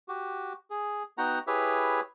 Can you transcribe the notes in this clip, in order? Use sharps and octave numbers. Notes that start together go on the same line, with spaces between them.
F#4 G4
G#4
B3 D#4 F#4 F#5 G5 A#5
E4 G4 G#4 B4 C#5 E5